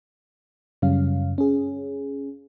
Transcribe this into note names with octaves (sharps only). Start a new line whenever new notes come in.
F#2 C#3 G3 C#4 F5
C#4 G#4